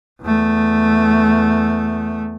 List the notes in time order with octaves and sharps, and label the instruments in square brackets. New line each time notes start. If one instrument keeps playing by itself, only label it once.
[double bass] E2 A3